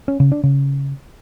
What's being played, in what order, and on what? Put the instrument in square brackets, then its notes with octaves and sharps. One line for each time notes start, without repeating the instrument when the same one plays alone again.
[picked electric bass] C#4
C#3
D4
C#3